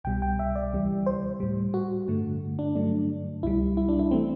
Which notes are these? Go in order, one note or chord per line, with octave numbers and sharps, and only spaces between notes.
C2 B2 G3 G5
G5
E5
D5
D2 C3 E3 G3
C5
A2 G3
F#4
G2 D3 A3
D4
G2 D3 F#3 A3 D4
C2 B2 G3 E4
E4
D4
E4
E3 A3 C4